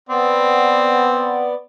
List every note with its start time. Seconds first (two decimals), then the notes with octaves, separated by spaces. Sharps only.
0.09 B3 C4 D5